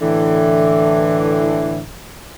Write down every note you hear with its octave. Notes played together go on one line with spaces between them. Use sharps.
A2 D3 E3